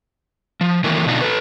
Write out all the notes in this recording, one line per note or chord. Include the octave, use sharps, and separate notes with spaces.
F3
D#3 E3 F#3 A3 A#3 A#4
B2 D3 D4 D#4 F4
A4 B4